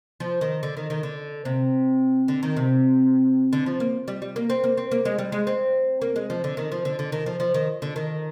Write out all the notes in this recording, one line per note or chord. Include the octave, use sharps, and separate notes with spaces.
F3
D#3
D3
D#3
D#3
D3
C3
D3
D#3
C3
D3
F3
A#3
G3
G3
A#3
C4
A#3
C4
A#3
G#3
G3
G#3
C4
A#3
G#3
F3
D3
D#3
F3
D3
D3
D#3
F3
F3
D#3
D3
D#3